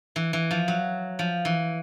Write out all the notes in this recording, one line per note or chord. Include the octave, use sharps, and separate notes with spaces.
E3
E3
F3
F#3
F3
E3